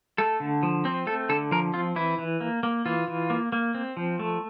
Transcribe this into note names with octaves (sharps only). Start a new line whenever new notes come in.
A3 A4
D3
F3
C4
A3 A4
D3 A4
F3 A#4
C4 F4
E3 E4
E3
A#3
A#3
E3 F4
E3
A#3
A#3
C4
F3
A3